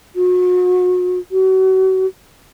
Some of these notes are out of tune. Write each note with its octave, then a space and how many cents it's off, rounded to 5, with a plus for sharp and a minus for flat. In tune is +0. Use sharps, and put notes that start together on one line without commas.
F#4 -35
F#4 +35